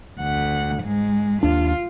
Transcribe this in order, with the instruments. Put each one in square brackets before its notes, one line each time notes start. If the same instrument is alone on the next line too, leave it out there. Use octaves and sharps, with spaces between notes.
[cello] D2 F#5
G#2 G#3
[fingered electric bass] D#2 D4 [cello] F4